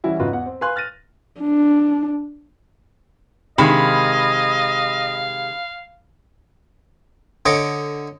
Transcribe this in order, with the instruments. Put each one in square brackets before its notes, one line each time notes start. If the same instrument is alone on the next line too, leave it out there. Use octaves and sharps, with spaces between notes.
[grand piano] E3 G3 C#4 E4 F#4
G#2 C#3 F4 F#4 B4
E2 F#5
C4
B4 F5 G#5 C6 F#6
F6 A6 A#6 D#7
[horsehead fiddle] D4
[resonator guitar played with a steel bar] C3 D#3 G#3 [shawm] D#5 [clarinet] F5 [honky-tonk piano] B5
[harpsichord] D3 C#5 D#5 D6